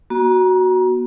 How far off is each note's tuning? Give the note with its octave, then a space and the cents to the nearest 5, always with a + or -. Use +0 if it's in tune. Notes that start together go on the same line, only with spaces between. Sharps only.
B3 -35 F#4 +0 A#5 +30